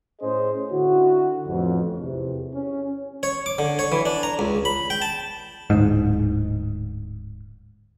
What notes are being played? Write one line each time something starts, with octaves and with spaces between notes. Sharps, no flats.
A2 C#4 G#4 C5 D#5
D3 E4 F#4
A1 F2
E2 C3
C#4
C#5
D6
D3
C#5
E3
D4
A#5
C#2
B5
G5
A5
D1 G#2